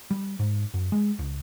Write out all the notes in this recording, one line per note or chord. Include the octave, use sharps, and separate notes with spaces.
G3
G#2
F#2
G#3
C#2